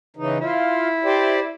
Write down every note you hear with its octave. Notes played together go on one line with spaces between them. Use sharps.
C#3 E3 D#4
E4 F4
G4 C5 D5